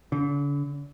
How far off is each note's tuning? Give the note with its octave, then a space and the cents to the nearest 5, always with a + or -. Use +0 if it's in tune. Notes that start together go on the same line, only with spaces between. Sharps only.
D3 -45